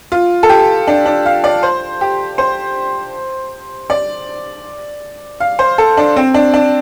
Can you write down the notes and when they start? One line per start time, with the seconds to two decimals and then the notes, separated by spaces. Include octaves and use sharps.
0.12 F4
0.43 A4
0.49 G4
0.87 D4
1.06 D4
1.26 F5
1.44 D5
1.63 C5
2.01 G4
2.38 C5
3.90 D5
5.40 F5
5.59 C5
5.78 A4
5.97 D4
6.16 C4
6.34 D4
6.54 D4